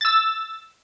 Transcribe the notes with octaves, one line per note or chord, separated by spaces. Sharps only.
E6 A6